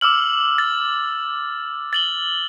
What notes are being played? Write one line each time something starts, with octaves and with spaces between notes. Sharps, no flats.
D6 E6 F6 F#7
A6
A6 F#7 G7